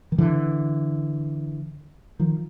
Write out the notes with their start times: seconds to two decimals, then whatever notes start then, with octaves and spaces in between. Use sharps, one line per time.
0.12 D#3
0.18 D3 E3
2.19 D#3 F3